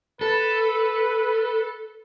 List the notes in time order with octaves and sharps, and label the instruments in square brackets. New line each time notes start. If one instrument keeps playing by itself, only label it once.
[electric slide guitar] A4 [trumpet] B4